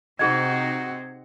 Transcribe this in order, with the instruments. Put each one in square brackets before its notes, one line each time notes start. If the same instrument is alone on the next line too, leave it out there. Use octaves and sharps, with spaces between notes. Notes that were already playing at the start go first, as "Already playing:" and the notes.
[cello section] C3 C4 D#4 [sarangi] F#4 [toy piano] G#4 D#5 [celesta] G#6